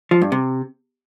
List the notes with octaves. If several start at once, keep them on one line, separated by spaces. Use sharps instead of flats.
F3
G2
C3